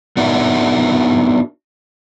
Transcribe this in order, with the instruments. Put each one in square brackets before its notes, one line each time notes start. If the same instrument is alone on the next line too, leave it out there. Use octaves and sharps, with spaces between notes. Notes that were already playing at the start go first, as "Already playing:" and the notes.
[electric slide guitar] B3 D4 D#4 F#4 A#4 E5